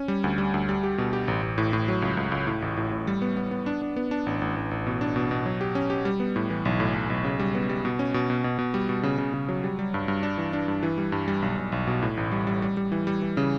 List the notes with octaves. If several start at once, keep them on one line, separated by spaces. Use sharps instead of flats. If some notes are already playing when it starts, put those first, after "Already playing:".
Already playing: C#4
G3
D2
G3
D2
G3
G4
B2
G4
A1
A1
A2
A2
F#3
C#2
C#2
C#2
A2
A1
A2
A2
G3
B3
B3
B3
D4
D4
B3
D4
A1
A1
A1
A1
B2
D4
B2
B2
F#3
G4
C#4
G4
G3
B3
A2
E3
B1
A2
B1
B1
C#3
G3
B3
G3
B2
C#4
B2
B2
B2
B2
G3
B2
C#3
C#3
C#3
F#3
G3
G3
G2
G2
D4
E3
D4
G2
E3
G3
G2
G3
B1
B1
B1
B2
A2
A1
G3
G3
G3
G3
E3
G3
E3
C#3